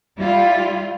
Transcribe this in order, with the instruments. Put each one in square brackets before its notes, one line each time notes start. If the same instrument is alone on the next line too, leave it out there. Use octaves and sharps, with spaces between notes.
[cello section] G3 E4 F4